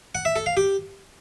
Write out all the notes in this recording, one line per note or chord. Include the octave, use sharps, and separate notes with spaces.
F#5
E5
A4
F5
G4